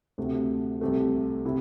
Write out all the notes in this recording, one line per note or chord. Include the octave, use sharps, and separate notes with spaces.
D2 C3 A3
C2 C3 A3
C3 A3 E4